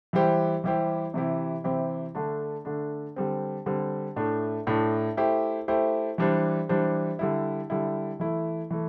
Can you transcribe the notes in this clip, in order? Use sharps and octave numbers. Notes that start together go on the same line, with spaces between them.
E3 G3 E4 G4 C5
E3 G3 E4 G4 C5
C3 E3 C4 E4 G4
C3 E3 C4 E4 G4
D3 A3 D4
D3 A3 D4
D3 G3 C4
D3 G3 C4
A2 A3 D4
A2 A3 D4
A3 E4 G4 C5
A3 E4 G4 C5
E3 G3 D4 C5
E3 G3 D4 C5
D3 G3 E4
D3 G3 E4
E3 A3 E4
E3 A3